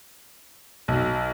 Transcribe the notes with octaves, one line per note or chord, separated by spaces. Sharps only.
B1